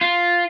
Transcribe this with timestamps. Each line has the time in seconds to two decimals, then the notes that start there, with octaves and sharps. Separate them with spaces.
0.01 F4